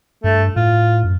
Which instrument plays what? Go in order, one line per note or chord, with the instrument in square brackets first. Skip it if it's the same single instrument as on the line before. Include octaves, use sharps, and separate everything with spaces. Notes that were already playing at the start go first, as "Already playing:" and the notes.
[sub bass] G2 [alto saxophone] A3
[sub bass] A2 [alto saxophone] F4
[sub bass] F#2